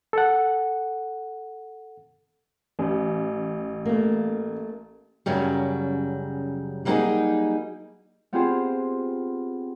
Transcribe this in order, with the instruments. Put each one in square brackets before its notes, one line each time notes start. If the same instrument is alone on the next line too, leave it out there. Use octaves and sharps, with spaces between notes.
[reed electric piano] A4 F#5
[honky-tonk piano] A1
[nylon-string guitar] A3 A#3
[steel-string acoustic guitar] F#2 C#3 F#3 G3
F#3 G3 A#3 B3 D#4 G#4
[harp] B3 C4 F4 G4 G#4 C5